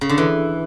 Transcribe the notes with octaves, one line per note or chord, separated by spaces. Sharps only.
C#3
D3
E3